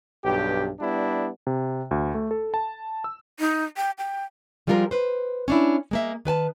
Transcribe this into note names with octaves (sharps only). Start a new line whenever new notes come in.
B1 G2 G4
G3 B3 D4 E4
C3
D2
A3
A4
A5
E6
D#4
G5
G5
F3 G3 G#3 F4 A4 A#4
B4 C5
C#4 D4 E4
G#3 A#3 E5
D#3 B4 G#5 A5